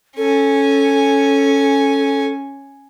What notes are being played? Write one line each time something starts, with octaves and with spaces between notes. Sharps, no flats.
C#4 A4 G#5